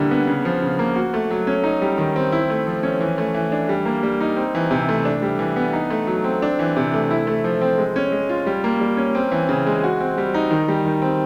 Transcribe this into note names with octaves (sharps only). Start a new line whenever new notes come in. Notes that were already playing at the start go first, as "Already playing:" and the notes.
Already playing: D3 G3 A#3 E4
B3
C#3
F3
C#3
A#3
F#4
A3
F#3
C#4
D#4
G3
D#3
C4
E4
A3
F3
C#4
E3
A3
E3
D4
G3
A#3
G3
D#4
C4
E3
C3
A3
D4
G3
E3
B3
D#4
A3
F#3
C4
D4
E3
C3
A3
E4
A3
F3
C4
G#3
C#4
G#3
F4
G3
A#3
G3
C#4
C4
E3
C#3
G#3
F#4
C4
G3
D#4
D#3
G3
D#3
C4